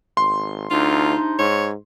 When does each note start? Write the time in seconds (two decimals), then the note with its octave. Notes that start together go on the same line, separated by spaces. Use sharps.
0.17 G#1 C6
0.71 D2 C3 D4 D#4 F4
1.39 G#2 C#5